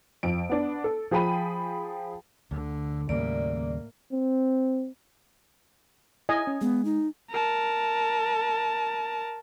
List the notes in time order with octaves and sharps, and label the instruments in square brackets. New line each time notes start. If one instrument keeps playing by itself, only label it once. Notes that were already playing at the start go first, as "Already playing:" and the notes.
[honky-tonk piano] F2 D7
B3 D4
A4
F3 G#4 G5 B5 D#7
[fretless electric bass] D2 [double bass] D3
[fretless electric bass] D#2 C#3 G3 [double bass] A2 A#3 [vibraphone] D5
[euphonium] C4
[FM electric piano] E4 [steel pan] D#5 G#5
[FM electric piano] C#4
[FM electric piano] G#3 [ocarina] B3
[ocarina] D#4
[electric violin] A#4 A5